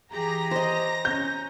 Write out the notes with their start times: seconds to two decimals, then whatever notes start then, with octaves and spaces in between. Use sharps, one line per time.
0.13 E3 G4 G#4 A#5 A#6
0.51 C5 D#5
1.05 C#4 G6